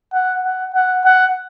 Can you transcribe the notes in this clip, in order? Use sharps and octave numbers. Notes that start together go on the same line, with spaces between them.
F#5
F#5
F#5
F#5